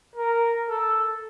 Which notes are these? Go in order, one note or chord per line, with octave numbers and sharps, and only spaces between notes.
A#4
A4